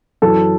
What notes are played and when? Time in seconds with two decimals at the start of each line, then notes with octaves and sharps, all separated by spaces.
0.22 F#2 E3 A4